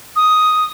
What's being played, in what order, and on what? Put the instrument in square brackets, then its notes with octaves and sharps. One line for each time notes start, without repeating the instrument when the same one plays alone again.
[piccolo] D#6